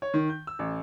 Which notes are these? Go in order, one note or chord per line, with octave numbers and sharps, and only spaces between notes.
C#5
D#3
G6
E6
A1